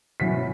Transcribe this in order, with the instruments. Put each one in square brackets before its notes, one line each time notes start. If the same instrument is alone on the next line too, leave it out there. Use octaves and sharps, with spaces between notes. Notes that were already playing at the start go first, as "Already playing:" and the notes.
[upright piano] B2 F#3 C#4 E4 B6